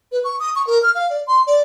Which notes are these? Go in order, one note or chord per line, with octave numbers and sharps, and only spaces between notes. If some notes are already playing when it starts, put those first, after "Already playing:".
B4
C#6
D#6
C#6
A#4
F6
F5
D5
C6
D5